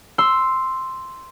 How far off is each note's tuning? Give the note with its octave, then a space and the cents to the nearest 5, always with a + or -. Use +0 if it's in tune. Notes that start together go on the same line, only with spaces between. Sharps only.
C6 +0 E6 +0